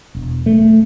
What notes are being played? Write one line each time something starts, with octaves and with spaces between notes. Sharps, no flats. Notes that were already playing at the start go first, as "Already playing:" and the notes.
E1
A3